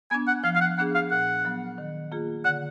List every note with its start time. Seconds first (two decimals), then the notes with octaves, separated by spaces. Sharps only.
0.11 B3 D4 G#5
0.27 F#5
0.44 F3 F5
0.55 F5
0.61 F#5
0.78 B3 D4 G#4 F#5
0.95 F5
1.11 A#2 F#5
1.45 F#3 B3
1.78 D#3
2.12 A#3 F4 G#4
2.45 D3 F#5